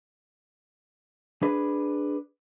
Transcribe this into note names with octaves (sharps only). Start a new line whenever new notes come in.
D4 G#4 B4